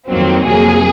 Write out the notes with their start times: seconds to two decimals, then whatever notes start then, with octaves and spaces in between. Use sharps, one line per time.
0.09 F2 D#3 F#3 A#3 C4
0.44 F2 C3 F#3 A#3 G#4